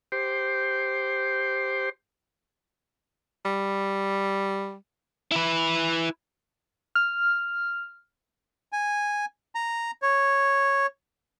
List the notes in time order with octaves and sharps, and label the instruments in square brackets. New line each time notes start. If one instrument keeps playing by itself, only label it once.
[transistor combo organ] G4 C5
[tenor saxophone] G3
[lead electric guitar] E4 B4
[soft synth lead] F6
[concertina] G#5
A#5
C#5